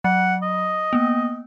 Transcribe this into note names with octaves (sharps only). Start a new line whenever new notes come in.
F#3 F#5
D#5
A#3 B3